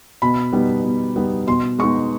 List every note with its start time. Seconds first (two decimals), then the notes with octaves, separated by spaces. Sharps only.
0.22 B2 B5
0.53 G3 B3 D#4
0.85 B2
1.16 G3 B3 D#4
1.47 B2 C6
1.78 G#3 B3 D#4 C#6